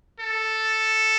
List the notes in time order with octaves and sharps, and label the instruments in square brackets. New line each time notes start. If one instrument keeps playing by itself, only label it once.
[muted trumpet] A4